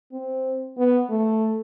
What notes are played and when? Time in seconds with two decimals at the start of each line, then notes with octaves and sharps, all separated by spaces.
0.13 C4
0.78 B3
1.10 A3